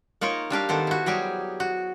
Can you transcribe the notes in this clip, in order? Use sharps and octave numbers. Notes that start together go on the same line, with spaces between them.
A#3 D#4 F4 A#4 C#5
G3 D4 G4 F5
D#3 B3 A4 C5
E4 F#4
F#3 G3 G4 G#4
F#4